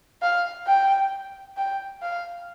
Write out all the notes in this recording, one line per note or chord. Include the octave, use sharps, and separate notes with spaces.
F5
G5
G5
F5